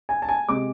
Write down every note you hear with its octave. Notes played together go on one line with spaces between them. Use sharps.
G#5
A5
G#5
C3 G#3 D6